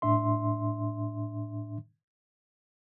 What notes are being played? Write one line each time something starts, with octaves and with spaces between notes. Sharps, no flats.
A2 D4 E5 C6